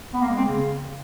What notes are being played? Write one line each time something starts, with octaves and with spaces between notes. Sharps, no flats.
B3
A#3
G#3
C4
C#3